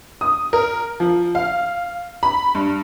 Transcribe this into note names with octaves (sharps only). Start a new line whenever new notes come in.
D#6
A#4
F3
F5
B5
G2